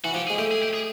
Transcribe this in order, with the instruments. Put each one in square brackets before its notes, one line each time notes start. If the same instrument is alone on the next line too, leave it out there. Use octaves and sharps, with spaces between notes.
[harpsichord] E3 [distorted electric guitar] F#4
[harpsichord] F3 [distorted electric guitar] G4
[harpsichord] G#3 [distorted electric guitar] G#4
[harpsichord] A3 [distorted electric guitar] G4
[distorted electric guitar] G#4
G4
G#4